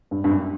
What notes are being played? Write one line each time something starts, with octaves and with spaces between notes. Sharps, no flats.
G2
G2
F#2